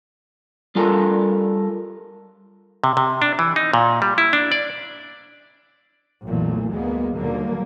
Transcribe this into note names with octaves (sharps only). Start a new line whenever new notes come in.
G3 F4 A4 A#4 G#5
C3
C3
D4
E3
D#4
A#2
G3
E4
D4
D5
B1 F2 A#2 E3 A3
D2 G3 G#3 A#3 B3
D#2 B2 D3 F#3 G3 A#3